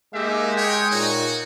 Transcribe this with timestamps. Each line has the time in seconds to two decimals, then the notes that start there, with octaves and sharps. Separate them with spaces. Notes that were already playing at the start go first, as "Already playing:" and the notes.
0.14 G#3 A#3 D#4 G4 E5
0.57 C#5 G5
0.91 A#2 D#4 F#4 C#5